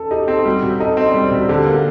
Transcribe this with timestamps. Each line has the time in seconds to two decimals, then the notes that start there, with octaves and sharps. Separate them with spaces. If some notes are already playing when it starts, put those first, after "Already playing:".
Already playing: A4
0.11 D#4 G4
0.28 C4 A4
0.45 G3 F#4
0.63 C3 F#4
0.80 D#4 A4
0.97 C4 D#5
1.10 G3 D5
1.23 C5
1.31 C3 F#4
1.49 D3 G4
1.66 A#3 F#4